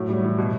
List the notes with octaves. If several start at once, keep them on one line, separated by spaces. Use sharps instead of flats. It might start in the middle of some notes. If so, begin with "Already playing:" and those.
Already playing: A2 F#3
G3
E3
B2